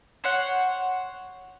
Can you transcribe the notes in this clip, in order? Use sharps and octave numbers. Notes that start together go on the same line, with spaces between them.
C5 C#5 F#5